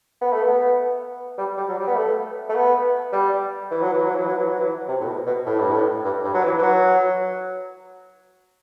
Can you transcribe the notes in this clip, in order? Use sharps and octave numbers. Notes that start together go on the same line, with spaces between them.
B3
A3
B3
G3
G3
F#3
G3
B3
A3
A3
B3
G3
E3
F#3
E3
F#3
E3
F#3
E3
F#3
E3
C3
A2
B2
B2
A2
G2
A2
G2
G2
F#3
E3
E3
F#3